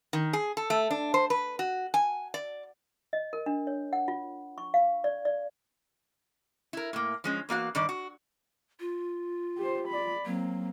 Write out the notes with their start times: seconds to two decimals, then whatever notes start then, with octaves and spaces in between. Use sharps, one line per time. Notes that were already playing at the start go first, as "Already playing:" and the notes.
0.13 D#3
0.33 G#4
0.57 A4
0.70 A3
0.91 D4
1.14 C5
1.30 B4
1.59 F#4
1.94 G#5
2.34 D5
3.13 D#5
3.33 A#4
3.46 D4
3.67 C#5
3.93 F#5
4.08 F4
4.58 C#6
4.74 F5
5.04 D5
5.25 D5
6.73 E4 A#4
6.93 A2 A#3
7.24 F3 G#3 C#4
7.49 E2 A#3 F#4 F5
7.75 G2 D#3 D5
7.89 F#4
8.80 F4
9.58 G4 C5
9.89 D5 B5
10.26 F#3 A#3 C4